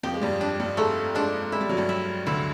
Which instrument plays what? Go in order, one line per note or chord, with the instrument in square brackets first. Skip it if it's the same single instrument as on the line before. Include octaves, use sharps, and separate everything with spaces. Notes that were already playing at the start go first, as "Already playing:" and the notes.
[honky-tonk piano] F2 F3 [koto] G4
[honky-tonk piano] G#3
G2 G3
[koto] D4
[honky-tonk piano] G2 G3
[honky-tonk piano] G#2 G#3 [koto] A3
[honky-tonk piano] G#2 G#3 [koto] D4
[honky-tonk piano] G#3 [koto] E4
[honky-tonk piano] G3
F#3
G2 G3
[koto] E4
[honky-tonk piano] D2 D3 [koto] E4